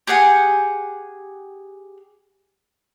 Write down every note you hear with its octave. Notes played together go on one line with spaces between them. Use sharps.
G4 G#4 F#5 G#5